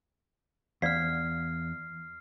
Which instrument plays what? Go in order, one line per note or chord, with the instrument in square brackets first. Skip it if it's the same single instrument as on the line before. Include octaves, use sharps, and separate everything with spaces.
[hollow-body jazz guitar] E2 [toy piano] D5 F5 [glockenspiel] F6 C7